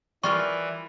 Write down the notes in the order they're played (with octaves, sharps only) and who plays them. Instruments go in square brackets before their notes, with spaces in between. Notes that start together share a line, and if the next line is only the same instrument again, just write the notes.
[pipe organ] E3 [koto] G3 F4 A#4 [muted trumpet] D5 [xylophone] C#6